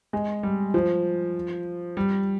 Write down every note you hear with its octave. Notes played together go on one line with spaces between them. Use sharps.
G#3
G3
F3
G3